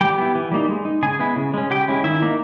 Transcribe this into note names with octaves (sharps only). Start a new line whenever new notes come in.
G3 G4 G5
B3 E4
E3
G3 A#3 D#4
G#3
D#4
C#3 G#4 G#5
G#3 B3 E4
C#3
G#3 C#4
C#3 G4 G5
G#3 C#4 E4
D#3 E4 E5
A#3 D#4